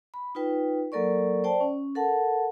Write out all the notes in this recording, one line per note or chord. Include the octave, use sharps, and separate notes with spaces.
B5
D#4 F4 B4 G5
F#3 A#3 A4 A#4 D5 C#6
C5 D5 G5 A5
C#4
A4 A#4 F#5 A5